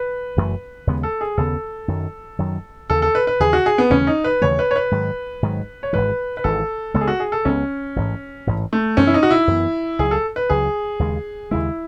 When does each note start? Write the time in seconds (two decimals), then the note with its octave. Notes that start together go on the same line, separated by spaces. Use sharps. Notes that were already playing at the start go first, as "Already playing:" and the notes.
Already playing: B4
0.37 F#1 F#2 E3 A3
0.87 D#2 C#3 G#3 B3
1.03 A4
1.21 G#4
1.37 D#2 C#3 G#3 B3 A4
1.88 F#2 D#3 F#3
2.39 F#2 D#3 F#3
2.90 D#2 C#3 E3 A4
3.02 A4
3.15 B4
3.27 B4
3.40 D#2 C#3 E3 G#4
3.53 F#4
3.66 G#4
3.78 B3
3.90 D#2 C#3 E3 A3 C#4
4.07 D#4
4.24 B4
4.42 D#2 C#3 E3 A3 C#5
4.59 B4
4.71 C#5
4.76 B4
4.91 G#2 D#3 F#3
5.43 G#2 D#3 F#3
5.83 C#5
5.93 G#1 G#2 E3 B4
6.37 B4
6.44 G#1 G#2 E3 A4
6.94 C#2 C#3 G#3 B3 A4
7.01 G#4
7.08 F#4
7.20 G#4
7.32 A4
7.45 C#2 C#3 G#3 B3 C#4
7.96 A1 G#2 E3
8.47 A1 G#2 E3
8.73 A3
8.97 F#2 E3 B3 C#4
9.07 E4
9.14 D#4
9.23 F#4
9.31 E4
9.47 F#2 E3 B3
9.99 C#2 C#3 F#3 G#4
10.11 A4
10.36 B4
10.50 C#2 C#3 F#3 G#4
10.99 D#2 C#3 G#3
11.51 D#2 C#3 G#3 E4